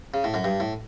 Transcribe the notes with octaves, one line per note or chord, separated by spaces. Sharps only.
C#3
A2
F#2
G2
A2